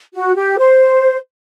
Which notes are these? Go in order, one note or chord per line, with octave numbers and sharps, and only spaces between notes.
F#4
G4
C5